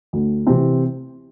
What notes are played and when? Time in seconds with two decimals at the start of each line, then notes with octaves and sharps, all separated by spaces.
0.13 D2
0.47 C3 E3 C4